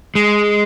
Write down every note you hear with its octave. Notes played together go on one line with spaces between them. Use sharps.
G#3